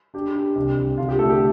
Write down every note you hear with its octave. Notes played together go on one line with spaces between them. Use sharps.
D4 G4
G4
C2
C2
D3 F4
G4
A3 A4
G4